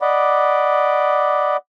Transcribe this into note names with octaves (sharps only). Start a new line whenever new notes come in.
D5 D#5 F#5 B5 D6